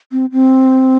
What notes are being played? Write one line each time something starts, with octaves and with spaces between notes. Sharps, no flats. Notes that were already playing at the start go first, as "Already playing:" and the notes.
C4
C4